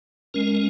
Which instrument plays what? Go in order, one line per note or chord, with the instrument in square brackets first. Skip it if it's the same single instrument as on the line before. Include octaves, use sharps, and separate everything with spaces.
[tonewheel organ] G#3 C#4 A#4